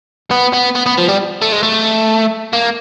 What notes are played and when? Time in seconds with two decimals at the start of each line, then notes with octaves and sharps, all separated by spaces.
0.31 B3
0.53 B3
0.75 B3
0.86 B3
0.98 F3
1.08 G3
1.42 A3
1.52 G#3
1.63 A3
2.53 A#3